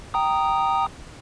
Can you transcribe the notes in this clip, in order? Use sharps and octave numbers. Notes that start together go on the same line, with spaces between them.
G5 A#5 D#6